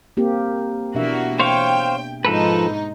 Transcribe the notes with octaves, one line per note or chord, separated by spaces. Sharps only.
A#3 C4 G4
B2 E3 A#3 D4 F#4 E5
C5 C#5 F5 G5
G#2 F3 D#4 A4 B4